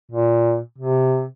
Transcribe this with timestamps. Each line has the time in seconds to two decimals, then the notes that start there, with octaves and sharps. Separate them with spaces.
0.12 A#2
0.78 C3